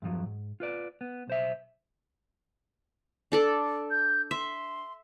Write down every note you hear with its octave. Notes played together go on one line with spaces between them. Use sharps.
E2 G2 B2 F3 F#3
G#2
F4 B4 D5
B3
B1 C5 E5
D4 A4 D5
G6
E5 C6